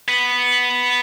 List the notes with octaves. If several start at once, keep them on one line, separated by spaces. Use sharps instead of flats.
B3